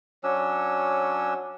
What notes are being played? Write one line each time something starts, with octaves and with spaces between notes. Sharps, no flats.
F#3 C#4 D4 E6